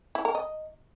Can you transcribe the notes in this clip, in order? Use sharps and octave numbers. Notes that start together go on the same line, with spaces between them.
E4
A#4
D#5